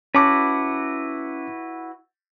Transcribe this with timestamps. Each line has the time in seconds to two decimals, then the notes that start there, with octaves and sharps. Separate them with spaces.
0.15 C#4 E4 F#4 B4 A5 D6